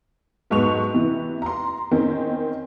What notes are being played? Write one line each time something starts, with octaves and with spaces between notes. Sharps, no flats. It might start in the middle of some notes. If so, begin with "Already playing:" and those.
B1 G#2 B3 C#6 F7
C3 E3
A#5 C6
E2 D#3 C4 C#4